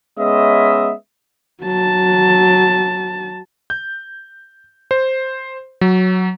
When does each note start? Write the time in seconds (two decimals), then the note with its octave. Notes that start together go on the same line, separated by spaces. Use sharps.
0.19 G#3 B3 C#4 D#5 E5
1.64 F#3 A5
3.70 G6
4.91 C5
5.81 F#3